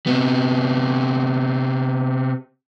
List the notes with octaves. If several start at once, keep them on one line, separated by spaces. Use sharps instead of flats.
C3 B3